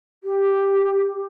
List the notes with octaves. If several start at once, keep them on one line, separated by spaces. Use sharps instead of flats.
G4